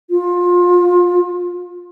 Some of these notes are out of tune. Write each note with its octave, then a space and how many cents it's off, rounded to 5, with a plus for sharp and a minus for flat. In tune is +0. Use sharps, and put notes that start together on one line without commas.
F4 +25